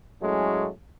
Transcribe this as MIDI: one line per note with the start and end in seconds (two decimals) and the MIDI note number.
0.23 0.69 45
0.23 0.69 54
0.23 0.69 56
0.23 0.69 57
0.23 0.69 61